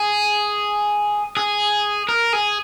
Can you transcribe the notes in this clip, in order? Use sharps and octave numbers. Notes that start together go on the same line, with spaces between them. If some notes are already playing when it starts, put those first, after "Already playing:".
Already playing: G#4
G#4
A#4
G#4